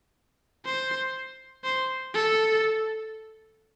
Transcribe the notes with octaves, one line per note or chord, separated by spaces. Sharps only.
C5
C5
A4